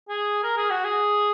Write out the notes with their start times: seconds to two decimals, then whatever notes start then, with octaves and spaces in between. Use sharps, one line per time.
0.09 G#4
0.44 A#4
0.57 G#4
0.71 F#4
0.85 G#4